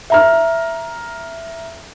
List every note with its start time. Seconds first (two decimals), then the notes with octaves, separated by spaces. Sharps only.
0.10 E5 A#5 F6